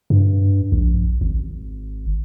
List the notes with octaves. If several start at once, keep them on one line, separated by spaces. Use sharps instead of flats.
G2
A#1
G#1